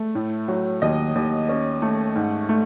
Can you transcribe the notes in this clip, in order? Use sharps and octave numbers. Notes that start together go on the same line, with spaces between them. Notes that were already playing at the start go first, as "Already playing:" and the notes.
Already playing: A3
A2
F#3
D#2 D#5
D#2
C#4
A3
G#2
A3